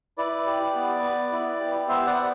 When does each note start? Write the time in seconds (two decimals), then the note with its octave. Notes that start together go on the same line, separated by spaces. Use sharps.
0.18 E4 B4 D5
0.47 G4
0.75 B3
1.03 B3
1.32 E4
1.60 G4
1.88 B3 C5 E5
2.07 D5 F#5
2.16 B3